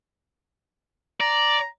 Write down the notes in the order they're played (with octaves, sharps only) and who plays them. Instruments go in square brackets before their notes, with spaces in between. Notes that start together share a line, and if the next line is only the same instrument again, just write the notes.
[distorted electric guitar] D5 [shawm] A#5